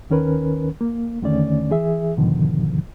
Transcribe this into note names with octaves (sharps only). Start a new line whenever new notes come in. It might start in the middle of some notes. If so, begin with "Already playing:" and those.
D#2 D#3 C#4 A#4 B4
A#3
E2 D3 D#3 A3 C#4 D5
E3 G#4 E5
E2 G#2 B2 D3 D#3 F3